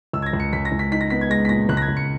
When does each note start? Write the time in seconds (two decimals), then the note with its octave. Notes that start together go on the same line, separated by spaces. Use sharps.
0.13 C#2 E6
0.22 G#6
0.26 A#6
0.33 C#2
0.40 C#7
0.53 C#2 B6
0.65 A#6
0.72 C#2
0.79 B6
0.92 D#4 B6
1.01 A#6
1.10 B3 B6
1.21 G#6
1.30 G#3 A#6
1.45 B6
1.49 A#2 A#6
1.69 C#2 F#6
1.77 A#6
1.82 G#6
1.88 C#2
1.97 C#7